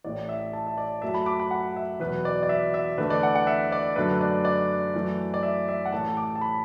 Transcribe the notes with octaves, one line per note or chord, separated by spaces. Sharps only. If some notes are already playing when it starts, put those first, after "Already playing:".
A1 A2 A3 D5
E5
A5
E5
D5
F#2 F#3 A3 E5
A5
B5
D6
B5
F#5
E5
E2 B2 F#3 B4
D5
D5
E5
E5
E2 D3 A3 B4
D5
F#5
F#5
E5
D5
F#2 D3 A3 B4
D5
D5
F#2 E3 A3
D5
E5
E5
F#5
A1 A2 A3 A5
D6
A5
B5